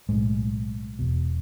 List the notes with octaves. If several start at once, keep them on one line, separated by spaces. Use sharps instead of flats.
B1 A2 G#3
E1 E2 B2